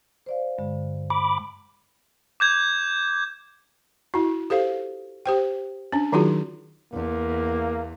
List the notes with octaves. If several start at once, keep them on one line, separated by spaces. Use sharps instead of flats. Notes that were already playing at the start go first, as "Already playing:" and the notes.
C5 D5 F5
G2 D3 G#3
B5 D6
D6 G6 G#6
E4 F#4
G4 A4 C5 F5
G4 C5 G5
C#4 D4
D#3 F#3 D#4 F4 F#4 G#4
E2 A#3